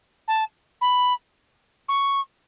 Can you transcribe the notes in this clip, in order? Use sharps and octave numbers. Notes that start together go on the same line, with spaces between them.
A5
B5
C#6